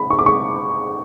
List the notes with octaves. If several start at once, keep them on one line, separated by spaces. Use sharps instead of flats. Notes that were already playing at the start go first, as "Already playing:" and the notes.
Already playing: B5
C#6
D6
C#6